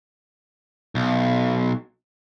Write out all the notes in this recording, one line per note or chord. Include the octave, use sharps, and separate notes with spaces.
B1